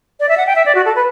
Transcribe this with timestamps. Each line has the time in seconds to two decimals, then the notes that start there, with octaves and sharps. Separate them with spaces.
0.20 D5
0.29 E5
0.37 F#5
0.47 G5
0.56 E5
0.66 D5
0.75 F#4
0.85 A4
0.96 B4